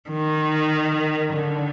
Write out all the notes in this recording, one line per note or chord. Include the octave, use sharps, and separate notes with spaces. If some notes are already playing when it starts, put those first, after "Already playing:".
D#3
D3